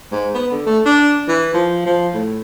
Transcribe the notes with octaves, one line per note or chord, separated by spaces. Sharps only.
G#2
B3
D3
A3
D4
E3
F3
F3
A2